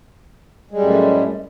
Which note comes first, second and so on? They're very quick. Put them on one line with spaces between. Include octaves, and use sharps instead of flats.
G#3 G3 F#2 A2